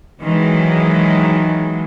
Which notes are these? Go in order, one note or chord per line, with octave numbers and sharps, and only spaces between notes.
D#3 E3 F#3 G#3